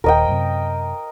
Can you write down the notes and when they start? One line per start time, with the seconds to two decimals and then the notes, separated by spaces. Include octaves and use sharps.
0.04 D#1 D#2 A#4 D#5 G5
0.28 F#2 C3